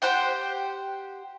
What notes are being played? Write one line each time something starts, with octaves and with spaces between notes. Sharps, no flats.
G4 C5 F#5 G5